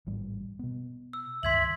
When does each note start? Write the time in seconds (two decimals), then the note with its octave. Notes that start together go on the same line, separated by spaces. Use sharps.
0.07 A1 G#2 G3
0.59 B2 B3
1.13 E6
1.43 C#2 G2 D#3 E5 C6 G#6 F#7